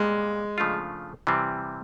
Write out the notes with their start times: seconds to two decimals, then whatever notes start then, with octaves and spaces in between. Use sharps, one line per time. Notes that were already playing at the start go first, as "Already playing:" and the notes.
Already playing: A#2 G3 G#3 B3
0.58 C#3 F3 A3 D4 F4
1.27 C3 E3 G3 C4